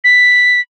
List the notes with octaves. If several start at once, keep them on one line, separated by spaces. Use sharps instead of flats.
B6